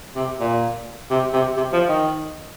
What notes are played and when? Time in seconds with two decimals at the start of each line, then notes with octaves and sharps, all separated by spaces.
0.16 C3
0.40 A#2
1.10 C3
1.33 C3
1.57 C3
1.73 F3
1.88 D#3